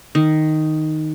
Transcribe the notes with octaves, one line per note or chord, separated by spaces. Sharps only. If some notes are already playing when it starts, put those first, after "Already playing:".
D#3